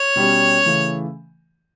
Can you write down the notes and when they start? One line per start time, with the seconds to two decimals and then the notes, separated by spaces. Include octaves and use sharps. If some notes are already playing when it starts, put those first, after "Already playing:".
Already playing: C#5
0.16 B2 G3 C#4 G4
0.65 C#3 E3 A3